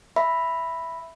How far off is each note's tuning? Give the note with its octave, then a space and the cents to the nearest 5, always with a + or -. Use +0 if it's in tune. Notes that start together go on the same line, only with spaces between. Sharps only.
E5 +0 B5 +0